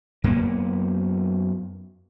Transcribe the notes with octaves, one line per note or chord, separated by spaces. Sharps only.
F#2 A#3 B3